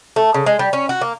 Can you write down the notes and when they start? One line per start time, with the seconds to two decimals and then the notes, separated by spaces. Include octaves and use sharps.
0.16 A3
0.34 C#3
0.46 G#3
0.59 G3
0.73 C#4
0.89 F#4
1.01 A#3